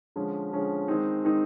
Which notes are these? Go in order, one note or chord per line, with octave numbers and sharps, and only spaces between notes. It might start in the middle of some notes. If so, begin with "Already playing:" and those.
D3 F3 G#3 C#4
D3 F3 G#3 C#4
D#3 G#3 C4 D#4
D#3 G#3 C4 D#4